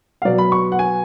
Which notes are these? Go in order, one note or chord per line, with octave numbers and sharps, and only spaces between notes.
F5
B2 F#3 D5
B5
C#6
F#5
G#5